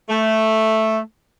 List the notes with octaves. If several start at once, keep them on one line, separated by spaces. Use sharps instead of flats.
A3